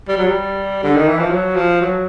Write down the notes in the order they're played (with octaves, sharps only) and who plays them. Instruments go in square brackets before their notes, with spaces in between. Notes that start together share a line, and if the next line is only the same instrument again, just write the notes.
[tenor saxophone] G3
F#3
G3
D3
D#3
E3
F3
F#3
F3
F#3